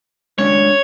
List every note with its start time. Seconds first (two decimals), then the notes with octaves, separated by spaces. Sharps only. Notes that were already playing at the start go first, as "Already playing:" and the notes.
0.38 G#3 C#4 D4 C#5